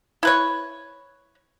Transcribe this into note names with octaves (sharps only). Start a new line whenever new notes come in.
E4 B4 C#5